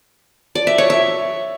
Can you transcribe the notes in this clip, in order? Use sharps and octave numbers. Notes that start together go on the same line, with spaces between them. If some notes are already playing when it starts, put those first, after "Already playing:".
D5
E5
C#5
E5